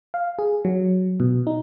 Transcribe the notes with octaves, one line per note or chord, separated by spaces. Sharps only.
F5
G#4
F#3
B2
D#4